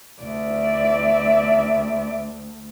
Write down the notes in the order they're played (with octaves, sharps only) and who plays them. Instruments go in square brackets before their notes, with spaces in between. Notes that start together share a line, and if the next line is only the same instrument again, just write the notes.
[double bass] D2 [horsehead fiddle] D5 E5